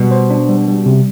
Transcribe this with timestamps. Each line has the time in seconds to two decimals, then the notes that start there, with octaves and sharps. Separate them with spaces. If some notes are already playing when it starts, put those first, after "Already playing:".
Already playing: B2 G3
0.11 C5
0.30 D4
0.49 G3
0.68 G3
0.86 C3